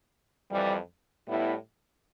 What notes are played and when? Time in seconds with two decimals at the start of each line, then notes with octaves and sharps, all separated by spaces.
0.50 F2 E3 G3
1.27 A2 G3 B3 E4